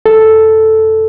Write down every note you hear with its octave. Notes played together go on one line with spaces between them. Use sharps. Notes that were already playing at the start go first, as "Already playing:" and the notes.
A4